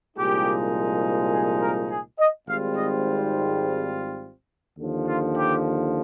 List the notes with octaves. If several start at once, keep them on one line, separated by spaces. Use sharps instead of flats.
C2 A#2 F3 G#3 D#4 G4
G#4
A#4
G#4
D#5
G#1 G#2 G3 C4 F4 F5
D#5
D#2 D3 F3
F4
G4